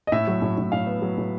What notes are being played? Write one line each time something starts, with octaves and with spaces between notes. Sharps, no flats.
D#5
A2 E5
F#3
A2
A2
A2 F5
B3
F#3
A2